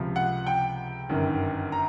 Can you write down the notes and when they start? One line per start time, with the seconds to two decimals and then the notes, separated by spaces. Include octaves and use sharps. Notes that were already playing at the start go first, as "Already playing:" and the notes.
Already playing: C#2 C3 F3
0.16 F#5
0.47 G5
1.09 G1 F#2 D#3
1.72 A#5